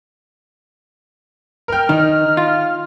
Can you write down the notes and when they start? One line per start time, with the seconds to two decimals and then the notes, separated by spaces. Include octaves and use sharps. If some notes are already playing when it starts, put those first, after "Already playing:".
1.68 A#4 G5 F6
1.89 D#3 D#4
2.37 F4